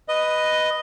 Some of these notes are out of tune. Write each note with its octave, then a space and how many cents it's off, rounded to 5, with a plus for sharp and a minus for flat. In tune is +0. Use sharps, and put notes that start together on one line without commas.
B4 +0 D#5 +0